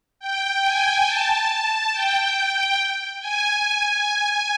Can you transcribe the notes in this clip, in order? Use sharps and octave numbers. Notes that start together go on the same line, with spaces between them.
G5
G#5
A5
A5
G5
G#5